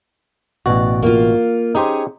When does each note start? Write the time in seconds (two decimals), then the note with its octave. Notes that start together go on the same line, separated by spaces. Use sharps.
0.66 A1 B2 F#4 D5
1.03 A#3 F4
1.75 C#4 D#4 G4 G#4 C5